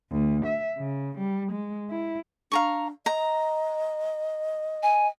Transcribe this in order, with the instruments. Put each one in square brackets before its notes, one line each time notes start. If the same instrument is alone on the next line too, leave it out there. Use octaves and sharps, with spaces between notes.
[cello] D2
E5
C#3
G3
G#3
E4
[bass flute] D4 [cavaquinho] F5 A#5 C#6
[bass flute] D#5 [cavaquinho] A#5
[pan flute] G#5